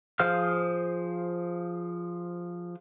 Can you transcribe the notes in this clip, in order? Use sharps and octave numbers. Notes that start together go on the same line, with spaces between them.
F3 G#4 C5 F5 F6